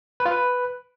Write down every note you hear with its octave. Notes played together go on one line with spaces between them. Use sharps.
B4
F4
B4